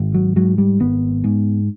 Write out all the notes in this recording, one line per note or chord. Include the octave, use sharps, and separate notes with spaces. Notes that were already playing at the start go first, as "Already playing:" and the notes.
Already playing: G#1
F#3
G#2 F#3
G3
G#1 B3
G#2